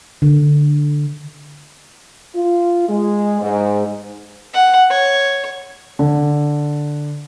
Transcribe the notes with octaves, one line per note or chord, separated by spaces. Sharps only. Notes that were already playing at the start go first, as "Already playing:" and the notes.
D3
F4
G#3
G#2
F#5
C#5
D3